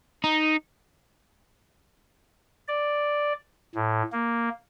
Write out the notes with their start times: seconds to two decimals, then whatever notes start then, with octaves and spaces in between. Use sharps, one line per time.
0.24 D#4
2.68 D5
3.75 A2
4.12 A#3